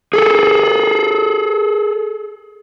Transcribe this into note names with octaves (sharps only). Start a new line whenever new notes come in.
G#4 A4